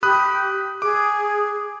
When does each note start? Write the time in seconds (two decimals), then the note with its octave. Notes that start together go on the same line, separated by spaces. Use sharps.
0.03 G4 B5 D#6 F#6
0.82 G#4 D6